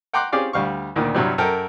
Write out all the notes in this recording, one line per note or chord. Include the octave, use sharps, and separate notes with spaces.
F#5 G5 A#5 C6 D6 F#6
C4 C#4 G4 G#4 D5 F5
D2 G3 F5 C#6
D2 A#2 D#3
G2 C3 F#3 G3
F#2 A4 A#4 G5